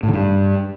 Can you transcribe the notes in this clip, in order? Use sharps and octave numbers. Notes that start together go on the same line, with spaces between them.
A2
D3
G2